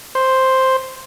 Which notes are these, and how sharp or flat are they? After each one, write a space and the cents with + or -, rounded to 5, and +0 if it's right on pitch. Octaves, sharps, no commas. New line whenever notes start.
C5 +0